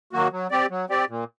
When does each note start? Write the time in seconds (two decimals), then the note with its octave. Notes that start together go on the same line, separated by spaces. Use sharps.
0.13 D#3 F#3 A#3 F#4
0.32 F#3
0.51 C4 G4 D5
0.70 F#3
0.89 C4 G4 D5
1.09 A#2